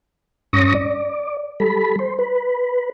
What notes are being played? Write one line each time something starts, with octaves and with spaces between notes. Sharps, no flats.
G2 C#4 C#6 D#6 A#6
D5
G3 A4 B5
C5
B4